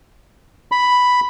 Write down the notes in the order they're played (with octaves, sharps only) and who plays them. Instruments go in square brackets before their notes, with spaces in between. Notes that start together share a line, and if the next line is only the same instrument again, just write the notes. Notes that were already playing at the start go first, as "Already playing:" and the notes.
[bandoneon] B5